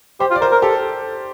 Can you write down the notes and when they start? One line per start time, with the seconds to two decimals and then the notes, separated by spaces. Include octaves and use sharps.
0.20 G4 C5
0.31 F4
0.35 D5
0.41 A#4 C5
0.52 A#4
0.62 G4 A4